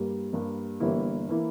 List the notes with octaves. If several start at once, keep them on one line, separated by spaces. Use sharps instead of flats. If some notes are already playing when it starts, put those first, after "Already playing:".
Already playing: G2 G3 A#3
G2 G3 A#3
G1 G2 E3 A#3 E4
E3 A#3 E4